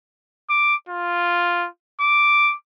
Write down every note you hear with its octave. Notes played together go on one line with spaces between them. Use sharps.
D6
F4
D6